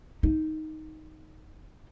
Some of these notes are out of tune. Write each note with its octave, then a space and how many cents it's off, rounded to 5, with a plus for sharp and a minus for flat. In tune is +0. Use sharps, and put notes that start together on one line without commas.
D#4 +5